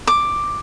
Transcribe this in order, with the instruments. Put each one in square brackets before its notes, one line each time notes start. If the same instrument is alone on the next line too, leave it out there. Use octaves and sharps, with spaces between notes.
[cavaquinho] D6